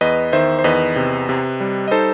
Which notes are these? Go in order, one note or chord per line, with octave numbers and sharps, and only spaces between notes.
E2 B4 D#5
D#3 C5 E5
C5
E2 B4 D#5
C3
C3
G3
D#5
D#4 A4 C5